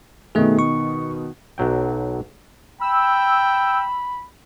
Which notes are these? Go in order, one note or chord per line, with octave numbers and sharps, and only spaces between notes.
B2 D#3 A3 G#4
C#6
B1 F#3 G5
G5 B5 E6